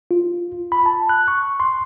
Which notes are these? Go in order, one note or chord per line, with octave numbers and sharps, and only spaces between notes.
F4
B5
A5
F#6
C#6
C6